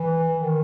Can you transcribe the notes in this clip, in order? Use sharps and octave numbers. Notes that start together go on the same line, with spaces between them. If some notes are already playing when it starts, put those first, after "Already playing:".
Already playing: E3
D#3